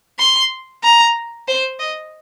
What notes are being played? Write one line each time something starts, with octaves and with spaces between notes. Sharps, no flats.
C6
A#5
C5
D#5